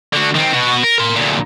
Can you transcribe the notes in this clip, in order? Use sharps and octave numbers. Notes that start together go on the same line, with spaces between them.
D3 F#4
D#3 C4
B2 F#4
A#4
A#4 C6
D2 A#2